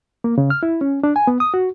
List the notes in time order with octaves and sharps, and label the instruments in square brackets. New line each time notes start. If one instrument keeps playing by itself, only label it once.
[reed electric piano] A#3
C#3
F6
E4
C#4
D4
G#5
B3
D#6
F#4